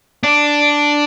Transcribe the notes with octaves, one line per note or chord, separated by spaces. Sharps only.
D4